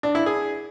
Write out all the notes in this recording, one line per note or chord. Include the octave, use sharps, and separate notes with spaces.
D4
E4
G#4